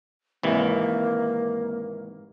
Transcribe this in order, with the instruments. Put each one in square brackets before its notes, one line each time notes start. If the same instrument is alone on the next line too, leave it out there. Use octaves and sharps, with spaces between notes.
[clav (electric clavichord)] G#1 C3 E3 [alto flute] A#3